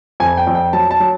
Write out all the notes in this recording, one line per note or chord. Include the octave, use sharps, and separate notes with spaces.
F2 G#5
G5
F2
G5
F#3 A5
A5
F#3